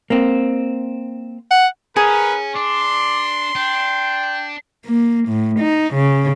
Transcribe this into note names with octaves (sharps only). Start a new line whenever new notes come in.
A#3 C4
F#5
C#4 G#4 A#4 B4
D4 D5 C6
D4 G5
A#3
A2
D#4
C#3